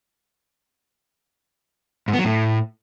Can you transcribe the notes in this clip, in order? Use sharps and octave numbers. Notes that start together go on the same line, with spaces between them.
G#2
B3
F#3
A2